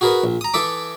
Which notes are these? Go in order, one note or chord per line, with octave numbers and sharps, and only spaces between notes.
F#4 G#4 A#4 B4 D#5
A#1
A#5 D#6
E3 A4 D#5 E5 D6